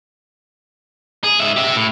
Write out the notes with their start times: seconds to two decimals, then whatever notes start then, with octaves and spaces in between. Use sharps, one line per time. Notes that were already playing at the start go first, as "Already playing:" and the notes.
1.24 G#4
1.40 G#2 E5
1.56 G4 E5
1.76 A2